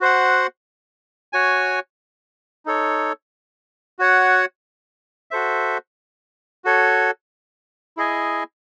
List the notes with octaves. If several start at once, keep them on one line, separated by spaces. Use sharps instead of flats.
F#4 C5 F#5
F#4 C#5 G#5
D#4 A4 C#5
F#4 C#5 F#5
F#4 A4 C5 E5
F#4 A4 C#5
E4 G#4 D#5 G#5